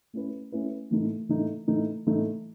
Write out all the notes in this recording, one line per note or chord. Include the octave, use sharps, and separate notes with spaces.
A3 C#4 E4 B4
A3 C#4 E4 B4
A2 E3 A3 D#4 A4
A2 E3 A3 D#4 A4
A2 E3 A3 D#4 A4
A2 E3 A3 D#4 A4